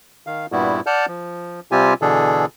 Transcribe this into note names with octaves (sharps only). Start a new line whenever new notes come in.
D#3 F5
G2 A#2 G3 B3 E4 F#4
D5 F#5 A5 F6 G6
F3
C3 G3 C4 F4 G4 G#5
B2 D3 E3 D4 G#4 A4